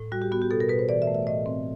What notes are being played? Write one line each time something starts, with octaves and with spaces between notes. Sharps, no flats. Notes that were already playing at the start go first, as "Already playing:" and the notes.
Already playing: A2
G3 F#4
G4
B3 F#4
G4
B2 A4
A#4
B2 B4
C5
E3 D5
E5
A3
E5
D5
A2 D#5
C4